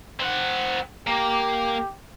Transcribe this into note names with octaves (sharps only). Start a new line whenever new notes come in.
C4 F#5
A#3 G4